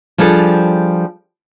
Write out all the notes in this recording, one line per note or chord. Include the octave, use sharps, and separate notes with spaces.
F3 G3 D4 G#4 A4